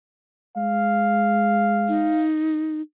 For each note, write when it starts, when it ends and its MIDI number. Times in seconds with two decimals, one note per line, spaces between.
0.57 2.17 56
0.57 2.25 77
1.88 2.81 63